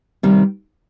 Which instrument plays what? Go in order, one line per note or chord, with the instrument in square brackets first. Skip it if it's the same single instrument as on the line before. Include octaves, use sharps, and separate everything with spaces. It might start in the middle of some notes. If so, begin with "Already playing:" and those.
[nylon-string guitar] C3 D#3 G3